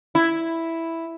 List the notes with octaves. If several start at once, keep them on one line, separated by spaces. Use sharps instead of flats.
E4